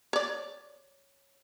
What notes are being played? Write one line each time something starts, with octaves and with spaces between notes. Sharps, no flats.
C#5 D5